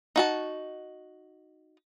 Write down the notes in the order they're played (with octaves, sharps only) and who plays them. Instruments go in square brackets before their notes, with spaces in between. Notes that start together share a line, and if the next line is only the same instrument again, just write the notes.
[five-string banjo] D#4 F#4 A5